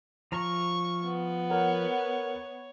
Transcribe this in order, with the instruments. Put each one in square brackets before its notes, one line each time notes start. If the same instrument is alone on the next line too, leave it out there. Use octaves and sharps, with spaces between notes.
[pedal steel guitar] F3 A#5 [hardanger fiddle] C#6
[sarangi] B3
[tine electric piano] A#4 F#5 [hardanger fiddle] C#5